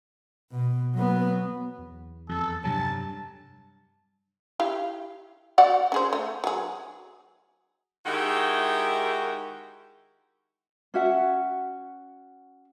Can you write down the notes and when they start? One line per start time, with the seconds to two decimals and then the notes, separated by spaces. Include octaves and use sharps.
0.51 B2
0.94 F#3 B3
1.78 E2
2.29 F2 A4
2.64 G2 C3 F#3 A5
4.60 E4 G4 F5
5.58 F#4 D5 F#5
5.92 C#4 G#4 C5
6.13 A3
6.44 F#3 G#4
8.06 D#3 G#3 E4 F#4 G4 A#4
10.94 C#4 F#4 E5 F#5